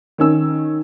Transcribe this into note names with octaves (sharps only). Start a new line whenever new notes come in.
D#3 C#4 E6